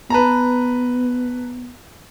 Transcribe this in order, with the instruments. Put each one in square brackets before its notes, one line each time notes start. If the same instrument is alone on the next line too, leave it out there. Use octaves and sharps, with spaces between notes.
[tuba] B3 [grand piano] B4 A5 A#5